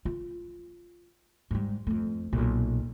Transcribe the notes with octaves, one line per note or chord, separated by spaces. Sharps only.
F4
G#2 G3
F2 A3
B1 A#2